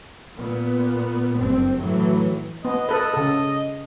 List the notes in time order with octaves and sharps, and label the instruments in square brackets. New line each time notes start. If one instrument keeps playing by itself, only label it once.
[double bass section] A#2 B3
F#1 G2 C4
A2 E3 F#3
[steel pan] B3 [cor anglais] D#5
[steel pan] A4 B4 [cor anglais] D#5
[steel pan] C#3 A4